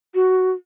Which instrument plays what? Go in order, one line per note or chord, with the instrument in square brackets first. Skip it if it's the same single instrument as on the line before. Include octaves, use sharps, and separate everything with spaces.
[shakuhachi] F#4